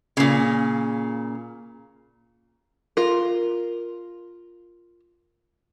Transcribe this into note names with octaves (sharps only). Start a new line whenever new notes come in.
A#2 C#3
F4 A#4